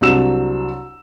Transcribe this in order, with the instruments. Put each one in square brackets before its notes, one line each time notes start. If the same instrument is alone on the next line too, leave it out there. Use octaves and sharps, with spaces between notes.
[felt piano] C2 F#3 D4 E6 E7